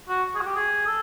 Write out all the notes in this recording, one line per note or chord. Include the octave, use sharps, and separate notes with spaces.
F#4
G#4
F#4
G4
G#4
A4